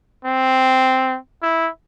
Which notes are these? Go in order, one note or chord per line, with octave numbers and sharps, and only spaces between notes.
C4
E4